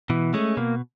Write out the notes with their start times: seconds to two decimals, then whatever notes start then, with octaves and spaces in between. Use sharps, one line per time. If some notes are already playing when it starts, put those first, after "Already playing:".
0.10 B2 E3
0.34 G#3 A3 C#4
0.57 B2 A#3